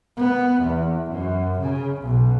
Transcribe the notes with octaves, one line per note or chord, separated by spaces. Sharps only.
B3
E2
F#2
C#3
B1